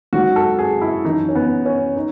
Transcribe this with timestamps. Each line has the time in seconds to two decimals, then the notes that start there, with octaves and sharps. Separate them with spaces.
0.13 G#2 F#3 F#4
0.36 A4
0.59 G#4
0.82 E4
1.04 F#2 E3 D#4
1.29 C#4
1.35 B3
1.66 C#4
1.96 D#4